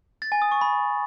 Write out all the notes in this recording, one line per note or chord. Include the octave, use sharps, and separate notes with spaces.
A6
G#5
D#6
C#6
B5